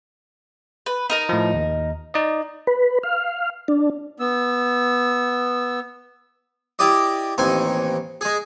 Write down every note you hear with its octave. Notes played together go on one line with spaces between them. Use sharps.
B4
D#4 A#4 A#5
A2 F3
D#2
D#4 D5 D#5
B4
F5
D4
B3 E6
E4 G4 D5 D#5
A1 D#2 C4 G#5
G#3 G#4